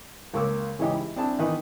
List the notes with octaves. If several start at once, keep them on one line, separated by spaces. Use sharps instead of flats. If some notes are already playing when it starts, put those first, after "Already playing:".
C#2 A#3 C#6 D6 E6
C#3 E3 G#3 C#4 D#4 G4
E4
C4 D4 E4 G#4 A5
D#3 E3 B3 D#4 B4